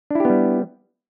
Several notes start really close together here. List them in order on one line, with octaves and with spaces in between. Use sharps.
D4 E4 G4 B3 G3